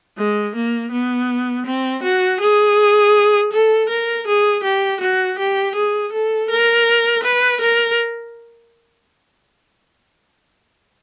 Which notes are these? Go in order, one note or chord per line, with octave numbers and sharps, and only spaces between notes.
G#3
A#3
B3
C4
F#4
G#4
A4
A#4
G#4
G4
F#4
G4
G#4
A4
A#4
B4
A#4